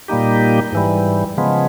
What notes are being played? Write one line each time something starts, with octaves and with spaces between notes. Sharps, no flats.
A#2 G3 A#3 D#4 G4
G#2 E3 G3
C#3 F3 G#3 B3